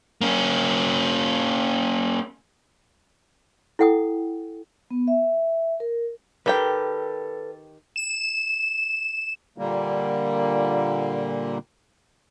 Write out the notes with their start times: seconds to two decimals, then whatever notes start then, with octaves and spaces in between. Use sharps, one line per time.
0.21 A#3 C#4
3.79 E4 A4 F#5 G5 D#6
4.91 B3
5.08 E5
5.80 A#4
6.46 D#3 G4 A4 B4 G5
7.96 E7
9.58 A#2 D3 G3 A#3